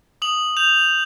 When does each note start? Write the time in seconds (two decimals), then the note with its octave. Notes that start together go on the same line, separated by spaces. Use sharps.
0.22 D#6 F#7
0.57 G6 F7